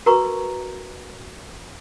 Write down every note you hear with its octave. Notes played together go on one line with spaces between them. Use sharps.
F#4 A#4 B4 A#5 C#6